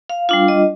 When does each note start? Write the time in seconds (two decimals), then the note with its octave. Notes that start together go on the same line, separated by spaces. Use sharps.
0.09 F5
0.29 G3 D4 F4 F5
0.48 D#5